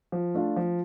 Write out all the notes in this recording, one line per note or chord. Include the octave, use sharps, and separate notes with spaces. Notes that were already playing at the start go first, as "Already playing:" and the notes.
F3
A3 D4 F4
F3